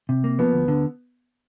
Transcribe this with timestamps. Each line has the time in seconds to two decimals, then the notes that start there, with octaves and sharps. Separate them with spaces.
0.09 C3
0.24 A#3
0.39 F3 B3
0.53 D2
0.68 D3